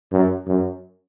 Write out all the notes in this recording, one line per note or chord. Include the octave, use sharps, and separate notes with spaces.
F#2
F#2